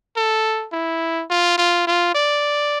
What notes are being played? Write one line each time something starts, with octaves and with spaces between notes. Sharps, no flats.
A4
E4
F4
F4
F4
D5